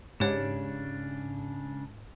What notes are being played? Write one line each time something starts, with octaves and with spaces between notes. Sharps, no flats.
G#2 C#3 D4 G4 C#5